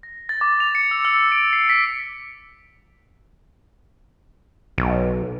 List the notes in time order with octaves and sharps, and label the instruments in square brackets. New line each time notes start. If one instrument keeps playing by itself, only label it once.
[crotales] A#6
A6
D6
F7
C#7
E6
E6
D7
C7
B6
[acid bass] B1